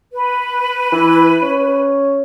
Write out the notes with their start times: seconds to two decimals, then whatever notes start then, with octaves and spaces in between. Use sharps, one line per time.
0.13 B4
0.92 E3
1.42 C#4